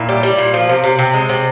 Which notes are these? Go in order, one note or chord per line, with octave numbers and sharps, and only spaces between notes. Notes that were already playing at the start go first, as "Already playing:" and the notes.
Already playing: A#2 E4
G3
G3
A#2
F3
C3
C3
C3
G#3
C3